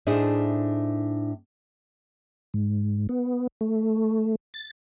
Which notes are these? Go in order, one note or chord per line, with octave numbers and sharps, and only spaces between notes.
A2 D4 D#4 G#4 C5 E5
G#2
B3
A3
A6